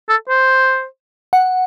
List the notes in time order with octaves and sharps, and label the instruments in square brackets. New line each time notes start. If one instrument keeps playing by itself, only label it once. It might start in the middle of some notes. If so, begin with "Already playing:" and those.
[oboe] A4
C5
[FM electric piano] F#5